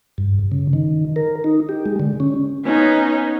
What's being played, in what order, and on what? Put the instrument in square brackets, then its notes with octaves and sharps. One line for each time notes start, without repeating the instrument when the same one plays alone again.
[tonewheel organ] G2
C#3
D#3
A#4
D#4
G4
G#3
D3
C#4
[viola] B3 C#4 [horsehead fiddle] D#4